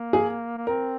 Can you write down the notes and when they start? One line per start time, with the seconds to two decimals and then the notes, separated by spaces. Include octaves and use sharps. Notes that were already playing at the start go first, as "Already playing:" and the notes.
Already playing: A#3
0.13 G#4
0.58 A#3
0.67 C4 A#4